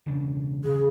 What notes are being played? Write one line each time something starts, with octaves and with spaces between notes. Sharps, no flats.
E1 C#3 D4
C#3 G#4